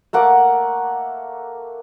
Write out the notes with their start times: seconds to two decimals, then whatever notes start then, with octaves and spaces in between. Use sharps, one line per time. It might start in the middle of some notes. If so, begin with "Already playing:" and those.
0.13 A3 A#3 F#5 D6